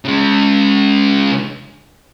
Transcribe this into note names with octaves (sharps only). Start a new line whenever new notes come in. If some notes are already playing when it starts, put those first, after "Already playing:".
C#3 G#3